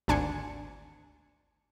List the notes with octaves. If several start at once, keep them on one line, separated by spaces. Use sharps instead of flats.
G#1 D2 D4 G#5 C6 C#7